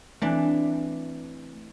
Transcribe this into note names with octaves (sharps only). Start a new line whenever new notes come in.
E3 A3 A#3 C4 D4